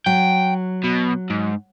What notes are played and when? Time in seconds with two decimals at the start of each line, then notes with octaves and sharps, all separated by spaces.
0.06 F#3 G5
0.84 B2
1.30 G#2